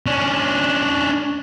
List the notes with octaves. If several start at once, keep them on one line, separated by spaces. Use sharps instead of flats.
C#4 D4